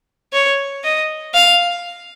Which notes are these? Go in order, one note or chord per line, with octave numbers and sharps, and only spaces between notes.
C#5
D#5
F5